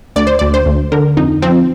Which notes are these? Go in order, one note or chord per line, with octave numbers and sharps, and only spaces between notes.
D2 D5
C5
D2 D5
C5
D2
D3 A#4
F2 D#4
F3 C4